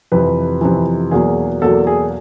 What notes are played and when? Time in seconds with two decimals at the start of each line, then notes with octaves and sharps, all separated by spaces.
0.12 F2 C3 E3 B4
0.61 F2 C3 E3
1.11 E2 B2 F#3 A#3 G#4
1.61 E2 B2 F#3 A#3 A4
1.87 G#4